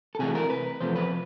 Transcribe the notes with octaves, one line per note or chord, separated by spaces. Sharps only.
A4
C3 E3 A3 G#4
A#4
B4
E2 C3 F3 A3 C5
B4